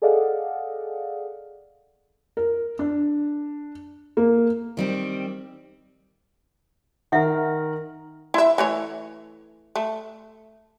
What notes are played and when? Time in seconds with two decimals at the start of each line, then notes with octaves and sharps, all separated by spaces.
0.02 G#4 A4 D5 D#5 F5 F#5
2.37 A#4
2.79 D4
4.17 A#3
4.77 D#3 G3 C4
7.12 D#3 A#4 E5 F#5
8.34 E4 E5
8.58 E3 A3 C#5
9.76 A3